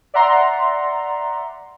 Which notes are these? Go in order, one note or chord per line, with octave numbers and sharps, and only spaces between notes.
D5 E5 F#5 A#5 C6